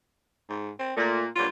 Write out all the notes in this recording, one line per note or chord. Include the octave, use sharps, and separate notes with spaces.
G#2
C4
A#2 A3
G2 A#2 F#3 F4